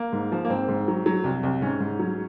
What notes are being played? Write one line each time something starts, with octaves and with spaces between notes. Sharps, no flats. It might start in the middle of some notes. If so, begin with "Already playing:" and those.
Already playing: A#3
G#2
F3
A#3
G#2 C4
G#2
F#3
F#3
C2
C2
G#2 C#4
G#2
F#3